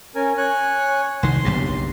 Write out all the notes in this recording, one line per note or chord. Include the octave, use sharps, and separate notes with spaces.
C#4 A#4 G#5
C#5 G#5 F#6
C2 D#3 C6
F#1 B1 G2